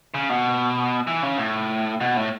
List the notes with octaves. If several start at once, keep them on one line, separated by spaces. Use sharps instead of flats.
C#3
B2
E3
C#3
A2
B2
A2